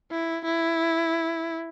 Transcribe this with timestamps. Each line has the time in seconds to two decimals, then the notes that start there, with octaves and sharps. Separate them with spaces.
0.11 E4
0.45 E4